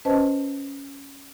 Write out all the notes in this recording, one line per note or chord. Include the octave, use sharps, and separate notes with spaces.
C#4 B4 C5 D#5 A5